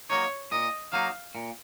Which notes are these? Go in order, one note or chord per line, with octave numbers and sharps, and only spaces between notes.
F#3 A#3 D#4 C#5
A#2 D#5
F#3 A#3 D#4 F5
A#2